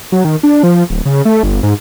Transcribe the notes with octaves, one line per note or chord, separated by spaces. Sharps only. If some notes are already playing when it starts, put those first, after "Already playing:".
F#3
D#3
D4
F3
D1
C#3
A3
G1
G#2